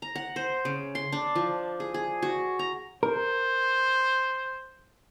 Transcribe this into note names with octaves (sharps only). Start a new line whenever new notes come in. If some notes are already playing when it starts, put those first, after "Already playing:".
A#5
F#5
C5
C#3
C6
D4
F3
G#4
G#4
F#4
A#5
A#4 C5